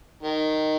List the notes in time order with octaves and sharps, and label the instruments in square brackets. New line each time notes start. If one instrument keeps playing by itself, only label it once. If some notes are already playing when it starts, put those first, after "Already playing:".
[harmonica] D#3